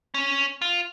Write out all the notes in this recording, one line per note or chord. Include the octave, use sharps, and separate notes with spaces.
C#4
F4